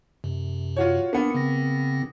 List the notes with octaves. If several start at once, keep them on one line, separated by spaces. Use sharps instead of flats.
F#2 C3
F4 F#4 C#5
A#3 B3 D4 C#7
C#3 C4 A#6